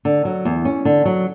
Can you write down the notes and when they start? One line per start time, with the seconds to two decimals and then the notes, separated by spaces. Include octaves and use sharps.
0.05 D3
0.25 F#3
0.45 E2
0.65 C#4
0.85 D3
1.05 F#3